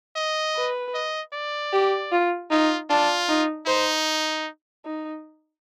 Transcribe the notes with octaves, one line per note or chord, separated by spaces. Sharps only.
D#5
B4
D#5
D5
G4
F4
D#4 F4
D4 F4
D#4
D#4 C5
D#4